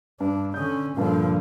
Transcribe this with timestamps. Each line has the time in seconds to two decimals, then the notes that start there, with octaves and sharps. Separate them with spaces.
0.20 G2 D4
0.54 D3 C#4 D#6 G6
0.97 G2 A#2 D3 F3